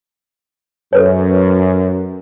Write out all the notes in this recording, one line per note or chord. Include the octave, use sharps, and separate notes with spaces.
F#2 A4 B4 C#5